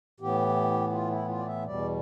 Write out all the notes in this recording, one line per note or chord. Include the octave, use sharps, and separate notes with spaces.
A2 E3 B3 G4
F4
E4
F4
D5
E5
E2 B2 G3 D5